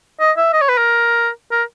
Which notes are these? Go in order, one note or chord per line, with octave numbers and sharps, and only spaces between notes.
D#5
E5
D#5
C#5
B4
A#4
A#4